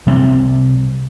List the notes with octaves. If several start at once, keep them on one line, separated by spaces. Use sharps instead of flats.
C3 G3 G#3 C4